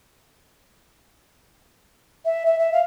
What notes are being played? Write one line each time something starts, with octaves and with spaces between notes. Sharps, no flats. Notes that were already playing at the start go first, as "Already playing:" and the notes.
E5
E5
E5
F5